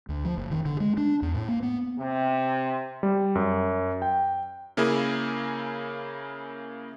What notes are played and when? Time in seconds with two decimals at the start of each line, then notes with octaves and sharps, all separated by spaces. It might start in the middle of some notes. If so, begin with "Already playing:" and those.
0.09 D2
0.25 F3
0.38 F#1
0.51 D#3
0.65 D3
0.80 G#3
0.97 D4
1.22 E2
1.34 A2
1.48 A#3
1.63 B3
1.99 C3
3.03 G3
3.35 F#2
4.02 G5
4.77 C#3 A#3 E4 G#4 A#4